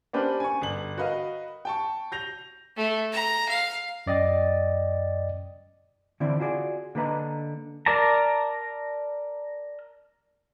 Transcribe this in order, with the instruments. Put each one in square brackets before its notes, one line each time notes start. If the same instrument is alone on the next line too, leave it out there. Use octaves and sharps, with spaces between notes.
[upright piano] A#3 C#4 D4 G4 B4 C5
G#5 C#6
G1 F#7
F#4 A#4 B4 D#5 F5
G5 A5 C#6
G6 A#6 F7
[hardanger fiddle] A3
A#5
F5
[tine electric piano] F#2 D5 D#5 G5 A6
[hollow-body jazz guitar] D3 E3 C4 E4 D5
F4 F#4 G#4 D5
D3 A#3 D4 B4 D#5 A#5
[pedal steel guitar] A#4 D5 A5 A#5